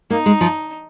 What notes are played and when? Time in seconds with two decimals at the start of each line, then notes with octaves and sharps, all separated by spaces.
0.10 A#3 D#4
0.26 G#3
0.41 F3